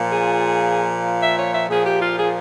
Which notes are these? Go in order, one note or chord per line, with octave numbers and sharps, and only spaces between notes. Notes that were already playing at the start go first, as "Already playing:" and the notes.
Already playing: A#2 F3
G#4
E5
C#5
E5
A#2 F3 G#4
G4
F4
G#4